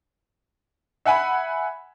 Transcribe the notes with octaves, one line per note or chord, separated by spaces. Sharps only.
E5 F#5 G#5 B5